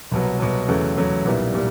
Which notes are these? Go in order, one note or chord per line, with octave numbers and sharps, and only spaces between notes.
C2 B2 F#3
C2 B2 F#3
E2 C#3 F#3 A3
E2 C#3 F#3 A3
B1 A#2 G3 B3 E4
A#2 G3